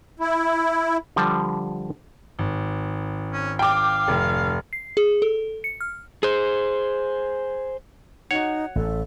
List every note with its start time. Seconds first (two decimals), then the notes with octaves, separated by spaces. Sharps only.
0.20 E4
1.16 D3 F3 G3 G5 A5
2.39 G#1
3.33 C#4
3.59 F5 G5 D6
4.08 F1
4.73 C7
4.97 G#4
5.22 A4
5.64 C#7
5.81 F6
6.23 G#4 C5
8.31 D#4 F#4 C#5 F#5
8.76 A1 A4